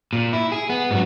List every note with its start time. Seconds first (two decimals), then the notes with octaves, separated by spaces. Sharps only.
0.13 A#2
0.33 E4
0.52 G#4
0.70 B3
0.91 G#2 F#3